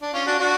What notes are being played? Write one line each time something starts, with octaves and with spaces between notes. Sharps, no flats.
D4
C#4 F4
D4 F#4
D4 F#4